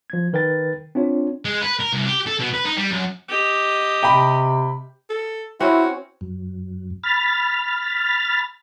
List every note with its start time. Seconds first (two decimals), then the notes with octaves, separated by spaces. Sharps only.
0.10 F3 G#6
0.33 D#3 A#4 B4 G5 A6
0.95 C4 D4 F4 C#5
1.45 G#3
1.61 B4
1.79 A#4
1.93 C2
2.05 G4
2.26 A4
2.39 B2
2.53 B4
2.65 D#4
2.77 G3
2.91 F#2
3.29 G4 D#5
4.03 C3 G5 B5
5.09 A4
5.60 C4 C#4 E4 F#4
6.21 F#2
7.03 B5 F6 A6